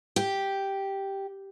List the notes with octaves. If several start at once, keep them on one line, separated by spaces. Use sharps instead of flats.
G4